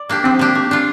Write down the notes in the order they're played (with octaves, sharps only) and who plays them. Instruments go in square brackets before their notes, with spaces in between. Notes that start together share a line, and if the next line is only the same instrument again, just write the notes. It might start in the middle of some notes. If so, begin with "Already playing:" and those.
Already playing: [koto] D5
A#3 D4 G4
[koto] F3 [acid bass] C4
[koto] A#3 D4 G4
A3
D4 F4